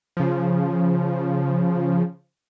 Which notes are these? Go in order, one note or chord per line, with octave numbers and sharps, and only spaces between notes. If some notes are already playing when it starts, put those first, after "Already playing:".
C#3 F3